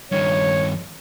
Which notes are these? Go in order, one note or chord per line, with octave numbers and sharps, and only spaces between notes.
G2 D#3 C#5